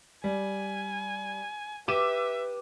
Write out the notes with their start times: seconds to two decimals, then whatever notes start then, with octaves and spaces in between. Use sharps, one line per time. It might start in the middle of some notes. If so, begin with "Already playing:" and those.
0.24 G3 G#5
1.88 G4 B4 E5 D6 D#7 E7